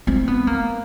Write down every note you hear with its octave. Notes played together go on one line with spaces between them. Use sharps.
C4
B3
A#3